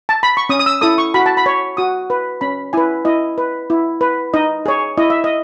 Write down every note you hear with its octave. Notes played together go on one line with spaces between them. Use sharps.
A5
B5
C#6
C#4 D#6
D#6
E6
E4 A4 D#6
C#6
F#4 B5
A5
B5
C#5
F#4 D#6
B4
C#4 B5
E4 B4 G#5
E4 D#5
B4
E4
B4
D#4 D#5
G#4 C#5
E4 D#5
E5
D#5